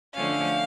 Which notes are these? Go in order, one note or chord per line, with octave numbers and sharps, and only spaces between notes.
D3 F3 A3 C#4 F5